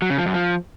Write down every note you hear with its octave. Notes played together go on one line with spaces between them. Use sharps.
F#3
C#3
F3
F#2
F3